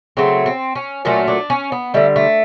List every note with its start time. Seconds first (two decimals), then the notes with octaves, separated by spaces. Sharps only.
0.17 C#3 F#3 A3 C4
0.46 C4
0.75 C#4
1.05 A#2 F#3 A3 C#4
1.28 D4
1.50 C#4
1.72 B3
1.94 D3 G3 A3
2.16 A3